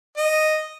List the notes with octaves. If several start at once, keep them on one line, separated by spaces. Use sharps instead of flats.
D#5